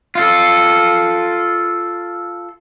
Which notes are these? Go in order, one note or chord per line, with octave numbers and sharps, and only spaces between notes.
F4 A4